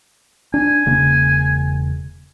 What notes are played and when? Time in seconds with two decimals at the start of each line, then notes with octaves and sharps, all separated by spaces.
0.54 D4 G#5
0.86 E1 C#3 A#3